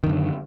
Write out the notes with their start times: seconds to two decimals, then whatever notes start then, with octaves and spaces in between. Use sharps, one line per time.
0.04 D#3
0.06 F#2
0.09 D3